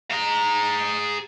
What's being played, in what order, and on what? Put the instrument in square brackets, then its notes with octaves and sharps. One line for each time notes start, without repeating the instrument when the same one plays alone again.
[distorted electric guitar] G#4 A#5